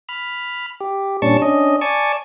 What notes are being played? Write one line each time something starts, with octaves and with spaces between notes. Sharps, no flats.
B5 F6
G4
A#2 G3 C#4 D4 A5 C#6
C#4 D4 D#5
D5 G#5 A5 C#6